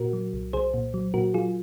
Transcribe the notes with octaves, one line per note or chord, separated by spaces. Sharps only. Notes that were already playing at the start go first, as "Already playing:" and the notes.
Already playing: A#2 F#4 A#4
F#3
C2
C2 G#4 C5
A#2
F#3
A#2 F#4 A#4
F#3 F4 G#4